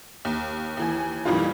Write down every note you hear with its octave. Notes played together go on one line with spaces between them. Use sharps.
D#2
D#2 E3 G#5
F2 A#2 D#3 E3 G3 F4